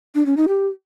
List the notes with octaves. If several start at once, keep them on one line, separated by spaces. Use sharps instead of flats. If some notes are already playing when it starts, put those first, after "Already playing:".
D4
C#4
D#4
G4